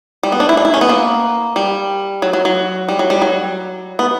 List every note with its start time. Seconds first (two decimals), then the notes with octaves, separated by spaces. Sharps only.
0.23 G3
0.32 B3
0.40 D4
0.49 E4
0.57 D4
0.65 E4
0.74 C#4
0.81 B3
0.89 A#3
1.56 G3
2.22 F#3
2.33 F#3
2.45 F#3
2.89 G3
2.99 F#3
3.10 G3
3.22 F#3
3.99 B3